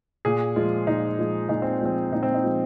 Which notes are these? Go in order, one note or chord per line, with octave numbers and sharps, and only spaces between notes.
A#2 G#4
F3 G#3 F4
A#2 D#4
F3 G#3
A#2 D#4
C4
F3 G#3 C4
A#2 D#4
C4
D#4
F3 G#3